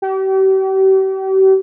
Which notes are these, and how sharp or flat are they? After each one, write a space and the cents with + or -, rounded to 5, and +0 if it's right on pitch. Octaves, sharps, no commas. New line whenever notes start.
G4 -40